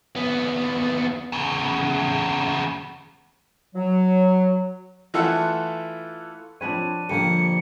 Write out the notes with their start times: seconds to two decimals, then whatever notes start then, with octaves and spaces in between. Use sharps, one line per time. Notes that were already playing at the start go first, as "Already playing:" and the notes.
0.16 D#2 B3
1.32 E2 C#3
3.75 F#3
5.14 E3 A3 F4 A4 E5 F#5
6.61 F3 C4 D4 B4 C#5 D#7
7.09 F2 D3 F3 G3 A#3 G4 C5 C#7